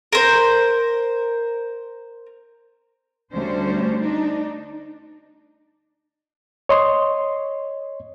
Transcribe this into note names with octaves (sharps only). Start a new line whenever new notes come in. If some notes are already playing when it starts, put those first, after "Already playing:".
A#4 C5
D2 G3 C#4 D4 C5
D4 D#4
C#5 D#5 C6